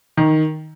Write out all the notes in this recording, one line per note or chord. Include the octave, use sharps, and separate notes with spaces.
D#3